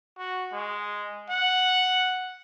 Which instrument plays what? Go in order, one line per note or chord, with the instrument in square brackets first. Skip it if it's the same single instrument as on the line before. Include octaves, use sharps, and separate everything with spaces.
[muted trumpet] F#4
G#3
F#5